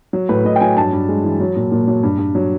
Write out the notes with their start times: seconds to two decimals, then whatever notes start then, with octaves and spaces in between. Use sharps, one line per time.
0.13 F#3
0.29 A2 B4
0.45 A2 D#5
0.56 G5
0.60 F#3 G#5
0.77 G2 A5
0.93 G2
1.09 G#3
1.24 E3
1.40 F#3
1.56 A#2
1.72 A#2
1.87 F#3
2.03 G2
2.18 G2
2.35 F#3